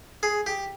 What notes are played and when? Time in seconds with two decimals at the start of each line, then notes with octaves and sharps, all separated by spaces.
0.23 G#4
0.46 G4